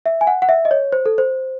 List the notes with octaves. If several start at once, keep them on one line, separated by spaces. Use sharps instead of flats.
E5
G#5
F#5
F#5
E5
D#5
C#5
C5
A4
C5